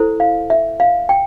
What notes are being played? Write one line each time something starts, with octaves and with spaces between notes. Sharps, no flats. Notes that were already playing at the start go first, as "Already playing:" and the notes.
Already playing: E4 A4 C5
F5
E5
F5
G5